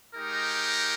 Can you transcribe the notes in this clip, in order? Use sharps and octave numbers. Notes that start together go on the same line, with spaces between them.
G#3 D#4 G4 A#4